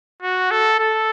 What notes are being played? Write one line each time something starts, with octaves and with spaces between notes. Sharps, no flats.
F#4
A4
A4